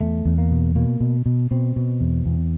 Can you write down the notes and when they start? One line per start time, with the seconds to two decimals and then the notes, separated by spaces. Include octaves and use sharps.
0.01 E2 A3
0.25 E2
0.38 A#3
0.51 B2
0.75 B2 A#3
1.00 B2
1.26 B2
1.51 B2 C4
1.76 B2
2.01 E2
2.26 E2